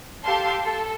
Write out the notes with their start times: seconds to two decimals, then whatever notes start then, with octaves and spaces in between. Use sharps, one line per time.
0.23 G4 A4 F5 A5 C6
0.64 A4